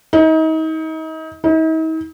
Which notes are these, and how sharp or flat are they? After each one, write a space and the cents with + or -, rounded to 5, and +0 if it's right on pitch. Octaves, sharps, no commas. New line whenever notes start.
D#4 +35
D#4 +45